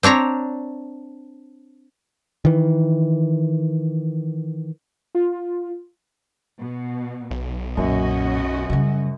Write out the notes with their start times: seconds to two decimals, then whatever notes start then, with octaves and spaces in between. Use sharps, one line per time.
0.03 C4 D4 C#5 A#5
2.45 D#3 E3
5.15 F4
6.61 B2
7.31 B1
7.77 F#2 A#2 C#4 F#4 D#5
8.70 C#3 G3